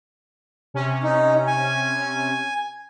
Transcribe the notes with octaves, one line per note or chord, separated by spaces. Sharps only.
C3 C#4
D#4
G#5